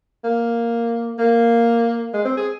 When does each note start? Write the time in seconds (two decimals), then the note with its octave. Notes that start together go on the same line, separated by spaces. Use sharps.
0.24 A#3
1.18 A#3
2.14 G#3
2.25 C4
2.37 G#4